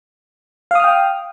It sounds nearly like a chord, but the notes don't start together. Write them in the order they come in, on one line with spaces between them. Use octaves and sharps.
F5 D#6 F6 G5